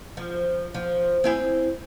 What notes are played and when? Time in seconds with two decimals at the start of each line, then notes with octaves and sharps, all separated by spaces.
0.17 F3
0.74 F3
1.24 C4 E4 G#4